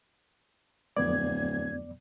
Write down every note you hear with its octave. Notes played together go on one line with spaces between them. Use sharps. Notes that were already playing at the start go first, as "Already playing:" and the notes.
D1 F2 B3 D5 G#6